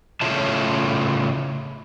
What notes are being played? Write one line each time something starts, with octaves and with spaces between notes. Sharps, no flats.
A2 C#3 F4 C#5 E5 A5